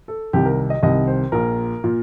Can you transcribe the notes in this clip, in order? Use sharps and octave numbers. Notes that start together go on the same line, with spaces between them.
A4
C2 C3 D#3 G4
A#4
D#5
C2 C3 D#3 D#5
C5
A#1 A#2 A#4
A#2